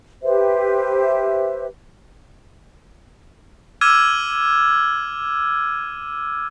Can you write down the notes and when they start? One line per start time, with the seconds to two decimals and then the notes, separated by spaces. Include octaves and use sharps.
0.23 G4 B4 C5 E5
3.81 D6 E6 F6 G#6 D#7